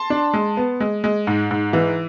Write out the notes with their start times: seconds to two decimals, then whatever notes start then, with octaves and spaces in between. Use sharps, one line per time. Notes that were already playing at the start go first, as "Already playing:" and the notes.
Already playing: A5 C6
0.10 D4
0.34 G#3
0.57 B3
0.80 G#3
1.04 G#3
1.27 G#2
1.51 G#2
1.73 E3